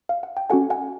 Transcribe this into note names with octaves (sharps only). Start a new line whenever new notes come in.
F5
F#5
G5
C#4 F#4 A4 F#5 G#5
F#5 G#5